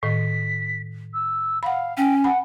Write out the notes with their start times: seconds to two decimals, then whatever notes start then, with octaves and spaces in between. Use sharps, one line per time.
0.03 A2 D#3 B6
1.14 E6
1.63 F5 F#5 B5
1.97 C#4 G5
2.24 F#5 G#5 B5